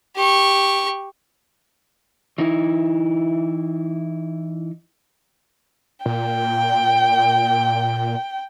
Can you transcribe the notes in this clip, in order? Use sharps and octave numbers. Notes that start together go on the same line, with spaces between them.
G4 C#6
E3 D#4 E4
A#2 G5